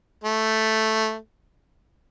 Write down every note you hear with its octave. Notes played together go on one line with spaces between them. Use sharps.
A3